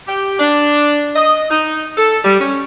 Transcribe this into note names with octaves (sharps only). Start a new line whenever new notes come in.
G4
D4
D#5
D#4
A4
G3
C#4